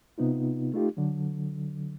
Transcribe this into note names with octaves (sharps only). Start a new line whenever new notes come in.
C3 B3 D#4 F4
A3 D#4 F4 G4
D3 F#3